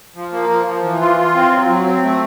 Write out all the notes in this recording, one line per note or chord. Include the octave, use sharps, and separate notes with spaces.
F3
A#3
F3
F3
E3
F4
F4
C4
F#3
F#3
C4
A3